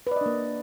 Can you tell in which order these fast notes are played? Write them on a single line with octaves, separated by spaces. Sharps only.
B4 D5 D#5 D4 A#3